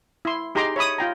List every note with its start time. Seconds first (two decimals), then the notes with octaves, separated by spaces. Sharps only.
0.25 E4 C6
0.55 D#4 G4 G#4 A#5 C6 D6
0.76 C#5 E5 B5 D#6
0.98 F4 G5 A#5